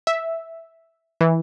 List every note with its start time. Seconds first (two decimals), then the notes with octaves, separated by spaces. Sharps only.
0.07 E5
1.21 E3